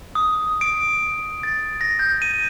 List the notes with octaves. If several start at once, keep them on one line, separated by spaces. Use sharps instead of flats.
D#6
D7
A6
A#6
G6
D#7